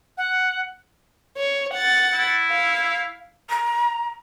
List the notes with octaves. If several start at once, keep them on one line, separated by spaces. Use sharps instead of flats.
F#5
C#5
F#5 A6
E4
F5
A#5